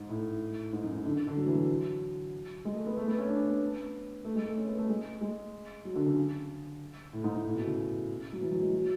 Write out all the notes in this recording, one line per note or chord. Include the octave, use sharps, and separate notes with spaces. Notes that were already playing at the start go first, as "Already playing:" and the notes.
Already playing: G#2
A2
G#2
F#2
G#2
D3
D3
D3
F#3
E3
F#3
G#3
A3
B3
A3
B3
C#4
D4
C#4
B3
A3
G#3
A3
C#4
B3
A3
G#3
G#3
F#3
D3
C#3
A2
G#2
G#2
A2
B2
C#3
F#3
E3
F#3
G#3
F#3